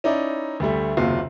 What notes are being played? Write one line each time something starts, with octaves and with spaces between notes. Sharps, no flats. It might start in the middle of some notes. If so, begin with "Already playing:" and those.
C#4 D#4 E4 D5
D2 G3 A3
F#1 D#2 C3 F4 F#4 C7